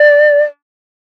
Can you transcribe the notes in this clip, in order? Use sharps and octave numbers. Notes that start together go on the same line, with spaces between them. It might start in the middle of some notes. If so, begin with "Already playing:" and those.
Already playing: D5